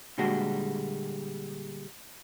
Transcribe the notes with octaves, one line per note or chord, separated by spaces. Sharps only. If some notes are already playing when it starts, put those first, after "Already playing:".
A#2 D3 G3 G#3 F#4